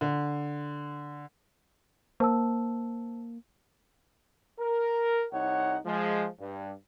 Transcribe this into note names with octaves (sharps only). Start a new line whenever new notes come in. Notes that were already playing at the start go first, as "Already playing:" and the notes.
D3
A#3 C5 A5 E6
A#4
C2 D#4 C#5 F#5
F3 G#3
G2